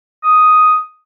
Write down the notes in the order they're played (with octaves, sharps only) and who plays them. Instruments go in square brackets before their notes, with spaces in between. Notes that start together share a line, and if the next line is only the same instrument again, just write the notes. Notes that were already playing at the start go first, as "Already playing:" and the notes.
[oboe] D#6